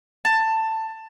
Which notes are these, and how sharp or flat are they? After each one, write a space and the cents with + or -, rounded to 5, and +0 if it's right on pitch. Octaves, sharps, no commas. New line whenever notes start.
A5 +15